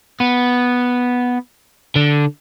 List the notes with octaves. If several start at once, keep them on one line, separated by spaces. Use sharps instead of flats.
B3
D3